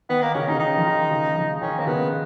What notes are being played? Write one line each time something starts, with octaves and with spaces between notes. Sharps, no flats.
D#3 B3
A#3
C#3 C#4
D#4
C#3
D#3 D#4
F3
D#3
C#3
C#3 F3
D#3 C#4
A#3
C#3 B3